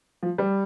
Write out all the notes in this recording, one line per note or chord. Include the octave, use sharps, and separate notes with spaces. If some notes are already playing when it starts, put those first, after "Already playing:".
F3
G3